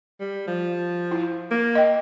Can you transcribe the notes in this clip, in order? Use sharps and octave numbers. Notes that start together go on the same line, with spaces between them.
G3
F3
E4
A#3
D#5 G5